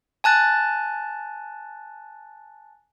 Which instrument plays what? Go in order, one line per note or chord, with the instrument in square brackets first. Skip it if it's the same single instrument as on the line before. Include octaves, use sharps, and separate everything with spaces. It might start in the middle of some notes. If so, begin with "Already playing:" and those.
[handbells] G#5 A5 F#6 A6